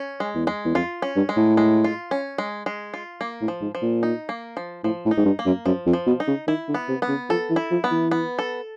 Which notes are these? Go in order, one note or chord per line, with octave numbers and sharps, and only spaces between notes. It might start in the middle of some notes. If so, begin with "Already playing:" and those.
Already playing: C#4
G#3
E2
G#3
E2
F2 F4
C#4
G2
G#3
A2
G#3
F4
C#4
G#3
G#3
F4
A#3
A2
F3
G#2
F3
A#2
D#4
A#3
F3
A2 F3
A2
D#4
G#2
G2
A#3
F#2
F#2 F3
F2
F3
B2
D#4
C#3
D#3 E4
D3
B3
C3
B3
C#3
F3 A4
E3
E4
F3
B3
E3
B3
A4